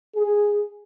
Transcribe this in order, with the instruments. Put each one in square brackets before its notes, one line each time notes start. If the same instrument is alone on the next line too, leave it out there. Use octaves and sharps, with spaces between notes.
[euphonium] G#4